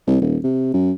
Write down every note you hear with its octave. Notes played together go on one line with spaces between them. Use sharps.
C2
D#1
C3
F#2